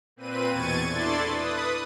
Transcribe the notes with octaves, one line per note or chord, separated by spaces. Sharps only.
A#2 C4 B4 D#7
E2 B2 C#6 G#6 A6 D#7
D4 E4 A4 D5 C6 A6
B4 D#6